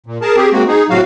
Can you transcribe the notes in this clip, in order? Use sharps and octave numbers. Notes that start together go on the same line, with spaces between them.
A#2
G#4 A#4 A5
C4 G4 G#4
G#3 A#3 C4 F#4
D#4 G#4
A2 C3 F#3 F#4 F5